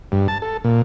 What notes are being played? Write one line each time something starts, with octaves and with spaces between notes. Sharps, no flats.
G2
A5
A4
A#2